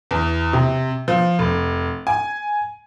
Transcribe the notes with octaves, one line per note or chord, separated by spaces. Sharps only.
E2
C3
F3
F1
G#5